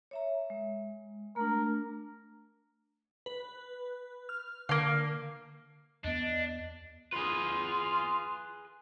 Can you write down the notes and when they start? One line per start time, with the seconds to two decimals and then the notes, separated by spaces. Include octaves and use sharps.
0.11 C#5 E5 A#5
0.50 G#3
1.36 A3 D4 A#4
3.26 B4
4.29 F6
4.69 D3 A#3 F5
6.04 E2 B3 D4 D#5
7.13 F4 G#4 B4